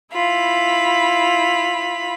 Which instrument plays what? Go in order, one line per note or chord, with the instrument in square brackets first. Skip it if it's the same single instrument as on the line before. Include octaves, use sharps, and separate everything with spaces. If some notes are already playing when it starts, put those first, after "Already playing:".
[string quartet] E4 F4 B5